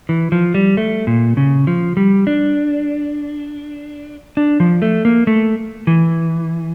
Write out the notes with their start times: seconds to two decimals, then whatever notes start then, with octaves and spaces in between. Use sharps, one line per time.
0.09 E3
0.32 F3
0.54 G3
0.77 A3
1.07 A#2
1.37 C#3
1.67 F3
1.97 G3
2.27 D4
4.37 D4
4.60 F3
4.82 A3
5.05 A#3
5.27 A3
5.87 E3